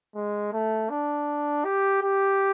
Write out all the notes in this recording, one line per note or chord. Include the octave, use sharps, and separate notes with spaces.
G#3
A3
D4
G4
G4